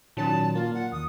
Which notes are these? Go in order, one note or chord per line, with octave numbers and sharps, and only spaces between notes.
A#2 D#3 F#3 C#4 A5
A#3 F4
F#5
D#2 D#6